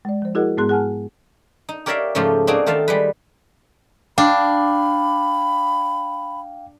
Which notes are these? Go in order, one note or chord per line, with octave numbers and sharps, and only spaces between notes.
G#3 D5
F3 C5
E4 F#4 G#4 A#4 D#5 F#5
G#2 G#3 B3 G#4 C6 F#6
G#4 F#5 G#5 A5 F6
D#4
G4 A#4 C#5 D5 E5 F5
G#2 C#3 F3 A3 F4 G4
A#3 C4 D4 D#4 F#4 G#4
D#3 A3 F4 F5 A5
G3 G#3 B4
D4 F5 G5 B5